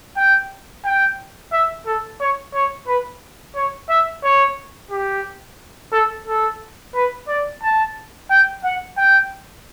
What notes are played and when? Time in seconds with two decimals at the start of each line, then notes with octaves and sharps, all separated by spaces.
0.17 G5
0.85 G5
1.52 E5
1.86 A4
2.20 C#5
2.54 C#5
2.87 B4
3.55 C#5
3.89 E5
4.24 C#5
4.91 G4
5.92 A4
6.27 A4
6.94 B4
7.28 D5
7.62 A5
8.30 G5
8.64 F#5
8.97 G5